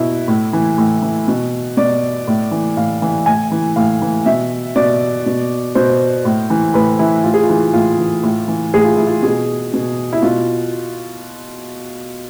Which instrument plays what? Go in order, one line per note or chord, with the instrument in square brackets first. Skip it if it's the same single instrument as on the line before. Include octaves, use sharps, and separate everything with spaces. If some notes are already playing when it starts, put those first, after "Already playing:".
Already playing: [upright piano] B2 E4
A2
E3
A2
E3
B2
B2 D5
A2
E3
A2 F5
E3
A2 G#5
E3
A2 F5
E3
B2 E5
B2 D5
B2
B2 C5
A2
E3
A2 B4
E3 E4
A2 F4
G#4
F4
E3
A2 F4
E3
A2
E3
A2 G#4
F4
E3 E4
F4
B2 G#4
B2
E4
B2 F4